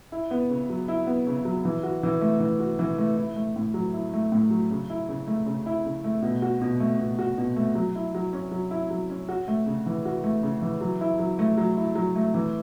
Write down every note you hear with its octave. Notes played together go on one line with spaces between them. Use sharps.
E4
B3
C#3
F#3
E4
B3
C#3
F#3
E3
F#4
E3
A3
E3
F#4
E3
A3
E4
A3
A2
F#3
E4
A3
A2
F#3
C#3
E4
C#3
A3
C#3
E4
C#3
A3
B2
F#4
B2
A3
B2
F#4
B2
A3
F#3
E4
F#3
C#4
F#3
E4
F#3
C#4
F#4
A3
C#3
E3
F#4
A3
C#3
E3
F#3
E4
F#3
A3
F#3
E4
F#3
A3
E3